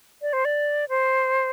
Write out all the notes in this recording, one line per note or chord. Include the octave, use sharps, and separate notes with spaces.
D5
C5
D5
C5